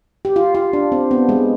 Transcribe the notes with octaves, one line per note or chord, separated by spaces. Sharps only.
G4
F4
F4
D4
C4
B3
G#3